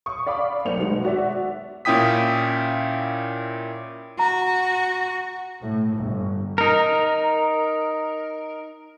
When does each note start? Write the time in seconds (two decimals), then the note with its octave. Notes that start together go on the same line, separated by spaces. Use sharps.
0.06 C#6 D#6
0.27 D5 F5 B5 D6
0.65 B1 A#3 C5 C#7 F7
0.79 B2 D#3 G#3
1.05 F#4 D5 E5
1.85 A#2 C#4 E4 G5 D#6 B6
4.19 F#4 A#5
5.61 A2
5.96 G1
6.58 D#4 A#4